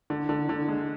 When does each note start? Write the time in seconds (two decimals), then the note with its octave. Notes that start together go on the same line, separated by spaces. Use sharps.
0.10 D3
0.29 D3
0.49 D3
0.68 G#3